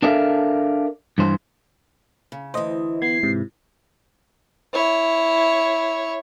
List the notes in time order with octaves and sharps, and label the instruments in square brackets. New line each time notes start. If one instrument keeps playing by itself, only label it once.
[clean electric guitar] D4 A4 A#4 D5 E5 F5
G2 E3 C5
[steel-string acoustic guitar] C#3
[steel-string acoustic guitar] D2 E3 [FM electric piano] C5 D#5
[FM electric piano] B3 G#6 [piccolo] C7
[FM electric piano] G#2 C3
[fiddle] E4 C#5